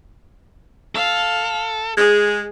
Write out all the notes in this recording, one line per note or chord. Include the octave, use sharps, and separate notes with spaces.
A4 F5
G#3 G#4